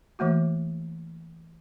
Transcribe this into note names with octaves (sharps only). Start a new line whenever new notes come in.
E3 A3 A#3 F#4